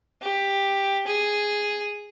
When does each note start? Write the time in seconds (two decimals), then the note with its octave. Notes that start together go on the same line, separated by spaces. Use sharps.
0.22 G4
1.07 G#4